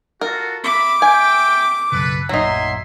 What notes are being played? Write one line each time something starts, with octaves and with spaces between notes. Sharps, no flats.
F4 F#4 A4 A#4
E5 B5 D6
E5 G5 G#5
B1 F#2 C#3 A4 B4
D1 A#1 F#2 F#3 D#4 E5 G#5 C6